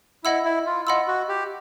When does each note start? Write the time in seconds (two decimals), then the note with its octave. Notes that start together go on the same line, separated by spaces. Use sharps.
0.24 E4 D#5 F#5 B5 E6
0.44 E4
0.66 F4
0.86 F4 D#5 F#5 B5 E6
1.08 F#4
1.29 G4